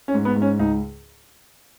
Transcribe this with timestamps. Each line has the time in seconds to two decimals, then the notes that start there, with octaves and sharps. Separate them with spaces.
0.08 C#4
0.14 G#2
0.25 B3
0.36 G#2
0.42 C#4
0.59 C#2 D#4